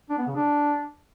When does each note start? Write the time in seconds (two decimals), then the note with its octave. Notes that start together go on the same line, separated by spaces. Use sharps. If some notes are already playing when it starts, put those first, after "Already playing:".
0.10 D4
0.18 B3
0.27 C#3
0.36 D4